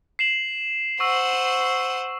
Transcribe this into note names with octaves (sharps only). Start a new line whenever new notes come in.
C7 E7 F#7
C5 F#5 C#6 E6